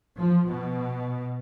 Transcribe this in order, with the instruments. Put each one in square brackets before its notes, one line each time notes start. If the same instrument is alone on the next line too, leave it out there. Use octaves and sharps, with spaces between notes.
[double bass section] F3
B2